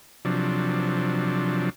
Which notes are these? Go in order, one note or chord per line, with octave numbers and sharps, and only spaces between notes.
C3 F3 F#3 D4